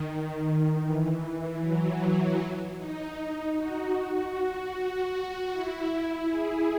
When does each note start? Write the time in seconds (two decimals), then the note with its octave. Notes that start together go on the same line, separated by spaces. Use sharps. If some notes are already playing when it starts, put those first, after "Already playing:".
Already playing: D#3
0.82 E3
1.21 E3
1.60 F#3
2.77 D#4
3.55 F#4
5.51 E4
6.28 G#4